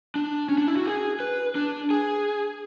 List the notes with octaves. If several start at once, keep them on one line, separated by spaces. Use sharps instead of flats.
D4
C#4
D4
E4
F#4
G#4
B4
D4
G#4